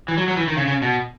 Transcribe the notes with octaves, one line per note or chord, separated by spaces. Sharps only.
E3
F#3
F#3
E3
D#3
C#3
C#3
B2